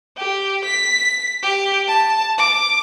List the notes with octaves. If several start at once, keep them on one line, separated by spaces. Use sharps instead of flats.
G4
B6
G4
A5
D6